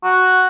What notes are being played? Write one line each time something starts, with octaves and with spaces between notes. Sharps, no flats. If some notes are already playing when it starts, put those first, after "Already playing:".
F#4